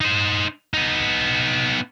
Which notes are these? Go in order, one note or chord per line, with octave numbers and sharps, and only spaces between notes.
D#4 C5
B3 D#4